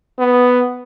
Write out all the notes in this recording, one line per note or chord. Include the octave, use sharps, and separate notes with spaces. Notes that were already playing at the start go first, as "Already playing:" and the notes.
B3